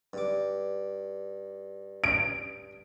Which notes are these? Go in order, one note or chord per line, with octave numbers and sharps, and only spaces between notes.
G2 D6
D7